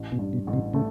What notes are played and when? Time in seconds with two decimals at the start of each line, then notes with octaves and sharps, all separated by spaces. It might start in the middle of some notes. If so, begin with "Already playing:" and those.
Already playing: A1
0.12 B2
0.19 G2
0.33 B2
0.47 A1
0.53 C3
0.74 C#3 A3